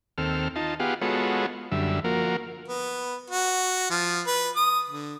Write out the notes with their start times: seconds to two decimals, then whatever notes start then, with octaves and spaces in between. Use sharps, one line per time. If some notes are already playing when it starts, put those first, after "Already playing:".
0.18 D#2 C4 A4 F6
0.56 D#4 F4 A5
0.80 B3 F4 G4 G#4 F5 F#5
1.02 G#3 B3 F4 F#4 A4 C#5
1.72 F#2 D3 G3 E5
2.04 F3 A#3 F#4 A#4
2.68 B3
3.30 F#4
3.90 F3
4.27 B4
4.56 D#6
4.89 D3